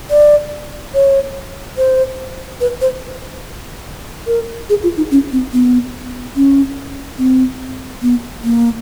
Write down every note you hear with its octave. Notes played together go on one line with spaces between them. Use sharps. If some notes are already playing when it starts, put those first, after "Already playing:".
D5
C#5
C5
B4
C5
A#4
G#4
F4
D#4
C#4
C4
B3
C#4
C4
B3
A#3